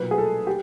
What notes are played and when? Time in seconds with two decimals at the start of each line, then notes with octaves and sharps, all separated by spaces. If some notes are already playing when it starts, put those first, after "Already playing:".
Already playing: B1 A#2 F#3 B4
0.11 G#4
0.18 A4
0.47 G4